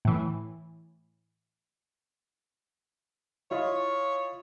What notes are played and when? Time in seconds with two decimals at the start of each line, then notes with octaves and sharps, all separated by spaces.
0.05 A2 E3
3.51 E4 F4 C#5 D#5